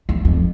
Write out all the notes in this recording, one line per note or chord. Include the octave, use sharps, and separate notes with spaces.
E2
F2